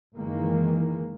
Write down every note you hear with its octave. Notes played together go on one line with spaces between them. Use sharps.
F#1 D#3 E3 G#3 A#3